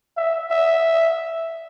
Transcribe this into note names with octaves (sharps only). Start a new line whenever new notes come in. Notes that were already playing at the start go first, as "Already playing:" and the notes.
E5
E5